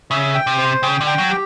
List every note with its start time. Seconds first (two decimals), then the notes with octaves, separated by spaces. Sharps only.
0.11 C#3 E5
0.35 G5
0.47 C3
0.58 C5
0.83 C#3 G5
1.01 D3
1.07 G5
1.18 F#3
1.31 G4